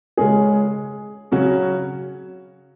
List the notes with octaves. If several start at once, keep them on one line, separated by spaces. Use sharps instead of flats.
C#3 G#3 C#4 G#4
C#3 F#3 C#4 F#4